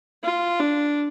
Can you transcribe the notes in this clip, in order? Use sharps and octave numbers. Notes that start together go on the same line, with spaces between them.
F4
D4